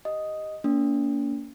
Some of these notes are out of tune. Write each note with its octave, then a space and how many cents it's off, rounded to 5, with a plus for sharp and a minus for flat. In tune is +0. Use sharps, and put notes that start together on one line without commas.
G4 +0 D#5 +0
A#3 +0 C#4 +45